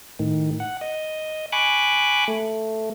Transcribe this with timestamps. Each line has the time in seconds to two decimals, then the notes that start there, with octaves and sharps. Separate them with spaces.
0.19 A2 D#3
0.60 F#5
0.81 D#5
1.52 G#5 B5 C#6 D6 F#6
2.28 A3